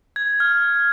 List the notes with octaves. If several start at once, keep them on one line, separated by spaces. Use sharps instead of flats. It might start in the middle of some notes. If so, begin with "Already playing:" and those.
G#6
F6